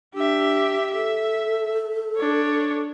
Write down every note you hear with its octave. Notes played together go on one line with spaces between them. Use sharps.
D4 G4 E5
A4 E5
D4 C#5